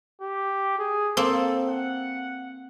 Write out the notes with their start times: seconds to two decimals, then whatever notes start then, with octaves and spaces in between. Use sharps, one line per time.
0.21 G4
0.79 G#4
1.17 A#3 C4 A4
1.69 F#5